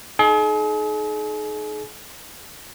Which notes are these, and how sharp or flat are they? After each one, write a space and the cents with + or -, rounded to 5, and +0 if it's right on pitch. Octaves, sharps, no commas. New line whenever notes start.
D#4 +0 G#4 +40